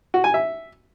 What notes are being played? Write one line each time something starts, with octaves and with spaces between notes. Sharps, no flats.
F#4
G#5
E5